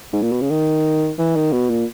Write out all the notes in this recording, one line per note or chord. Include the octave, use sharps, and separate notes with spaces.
G#2
A#2
B2
C#3
D#3
E3
D#3
B2
A#2